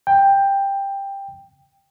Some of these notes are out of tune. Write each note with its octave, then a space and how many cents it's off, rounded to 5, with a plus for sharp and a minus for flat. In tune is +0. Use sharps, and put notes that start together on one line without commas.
G5 +10